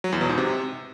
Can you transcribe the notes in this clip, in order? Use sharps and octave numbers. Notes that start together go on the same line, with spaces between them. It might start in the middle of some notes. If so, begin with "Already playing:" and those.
F#3
E2
B2
G#2
C3